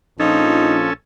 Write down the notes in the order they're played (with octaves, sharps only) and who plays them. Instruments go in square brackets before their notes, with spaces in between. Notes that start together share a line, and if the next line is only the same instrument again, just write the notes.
[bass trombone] A#1 [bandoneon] F3 [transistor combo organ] C#4 A4 [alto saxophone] D#4